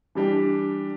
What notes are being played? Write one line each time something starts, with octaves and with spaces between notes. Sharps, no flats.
E3 G3 D4 G4